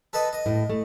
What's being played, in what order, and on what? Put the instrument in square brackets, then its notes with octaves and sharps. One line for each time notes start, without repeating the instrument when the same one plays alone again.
[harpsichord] A4 B4 D#5
D#5
[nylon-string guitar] A2
A3